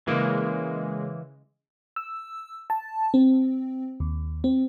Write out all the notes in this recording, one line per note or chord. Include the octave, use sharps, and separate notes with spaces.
C#3 E3 G#3 A#3
E6
A5
C4
D#2
C4